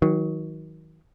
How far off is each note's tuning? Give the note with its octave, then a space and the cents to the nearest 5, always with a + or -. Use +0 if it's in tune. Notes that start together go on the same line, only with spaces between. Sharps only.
D#3 +35 F#3 +0